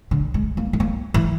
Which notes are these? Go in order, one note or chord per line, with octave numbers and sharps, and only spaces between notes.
D3
G#3
A#3
A3
A#3
E3